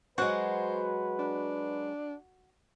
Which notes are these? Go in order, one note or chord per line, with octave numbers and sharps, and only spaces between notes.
F#3 G#3 F#4 B4 C5 F#5
D4